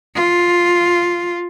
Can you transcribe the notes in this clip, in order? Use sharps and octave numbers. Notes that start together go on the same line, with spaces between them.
F4